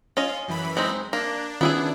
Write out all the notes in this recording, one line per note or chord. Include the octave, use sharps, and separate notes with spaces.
C#4 F4 D#5
F#2 E3 B5
G#3 C4 D#4
A#3 D4
D#3 B3 C#4 E4 F4 G#4